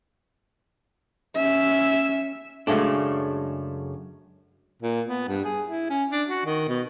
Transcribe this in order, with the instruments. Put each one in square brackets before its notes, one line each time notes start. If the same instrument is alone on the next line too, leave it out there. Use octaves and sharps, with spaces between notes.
[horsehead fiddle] C#4 E5
[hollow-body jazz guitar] F#2 C#3 G#3 A3 D4
[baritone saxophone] A#2
B3
G2
G#4
E4
C#4
D4
F#4
D#3
B2